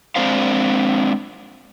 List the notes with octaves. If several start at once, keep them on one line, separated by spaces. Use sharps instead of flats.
G#3 C4 D4 C5 F5